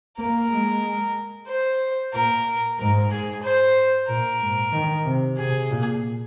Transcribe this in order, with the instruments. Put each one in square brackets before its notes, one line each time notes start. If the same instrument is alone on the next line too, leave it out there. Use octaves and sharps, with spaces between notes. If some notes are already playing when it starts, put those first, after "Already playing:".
[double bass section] A#3 [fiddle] A#4
[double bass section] G#3
[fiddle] C5
[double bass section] A#2 [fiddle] A#4
[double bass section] G#2 [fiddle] A#4
[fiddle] G#4
C5
[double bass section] A#2 [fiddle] A#4
[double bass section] G#2
D#3
C3
[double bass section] C3 [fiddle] G#4
[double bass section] A#2